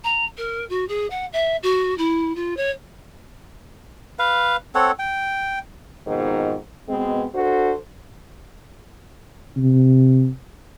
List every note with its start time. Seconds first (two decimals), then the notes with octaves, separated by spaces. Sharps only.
0.04 A#5
0.37 A#4
0.69 F#4
0.88 G#4
1.10 F#5
1.33 E5
1.63 F#4
1.98 E4
2.35 F4
2.56 C#5
4.19 B4 F5
4.75 C4 A4 C#5 F#5
4.99 G5
6.07 F2 G#2 B2 D#3
6.89 B2 G#3 B3 C4
7.34 D4 F#4 A4 C5
9.57 C3